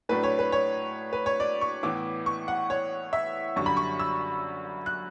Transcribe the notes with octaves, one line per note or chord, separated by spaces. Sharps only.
A2 F#3 A3 D4 B4
C#5
B4
C#5
B4
C#5
D5
C#6
A2 E3 B3 E4 D6
C#6
F#5
C#5
E5
F#2 D3 G3 C#6
B5
C#6
E6
F#6